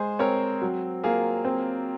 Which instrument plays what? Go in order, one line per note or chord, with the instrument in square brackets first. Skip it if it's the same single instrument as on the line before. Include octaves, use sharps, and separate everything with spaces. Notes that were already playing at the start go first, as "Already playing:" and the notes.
Already playing: [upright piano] G#3 [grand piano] G#4 C5
[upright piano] C4 [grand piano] A#4 C#5
[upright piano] F#3
[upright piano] A#3 [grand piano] F4 G#4
[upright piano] C4